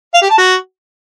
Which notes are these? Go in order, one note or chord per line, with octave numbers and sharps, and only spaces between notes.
F5
G4
A5
F#4